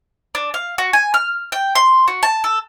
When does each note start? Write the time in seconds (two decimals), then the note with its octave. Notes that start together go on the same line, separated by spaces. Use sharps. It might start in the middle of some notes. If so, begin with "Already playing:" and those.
0.35 D4
0.54 F5
0.78 F#4
0.93 G#5
1.14 F6
1.52 G5
1.75 C6
2.08 F#4
2.23 A5
2.44 A4